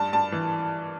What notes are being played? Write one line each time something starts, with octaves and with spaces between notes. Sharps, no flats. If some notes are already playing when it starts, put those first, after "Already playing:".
Already playing: G2 A5
G2 A5
E3